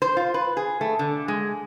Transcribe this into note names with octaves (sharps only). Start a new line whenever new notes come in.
C5
F4
B4
G#4
A3
D3
G#3